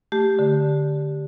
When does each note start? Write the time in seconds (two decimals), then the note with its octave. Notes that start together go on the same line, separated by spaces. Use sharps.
0.12 A3 G4
0.39 D3